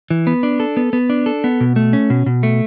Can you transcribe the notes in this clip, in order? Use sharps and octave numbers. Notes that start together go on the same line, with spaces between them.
E3
B3
D4
A4
B3
B3
D4
A4
B3
B2
A3
C#4
B2
B2
A3